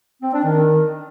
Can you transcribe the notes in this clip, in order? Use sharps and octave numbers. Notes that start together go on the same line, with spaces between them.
C4
D4
D#3